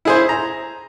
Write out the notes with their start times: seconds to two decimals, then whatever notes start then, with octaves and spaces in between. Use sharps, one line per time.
0.05 E4 G#4 C5
0.29 A#5